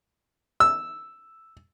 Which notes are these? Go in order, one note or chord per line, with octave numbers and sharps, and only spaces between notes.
E6